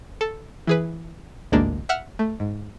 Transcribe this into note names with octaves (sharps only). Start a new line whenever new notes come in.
A4
E3 G#4 B4
A1 D2 G#2 G#3 A#3 D4
E5 F#5 F6
A3
G#2